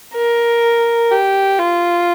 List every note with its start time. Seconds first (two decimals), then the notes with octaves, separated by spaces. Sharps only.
0.14 A#4
1.11 G4
1.59 F4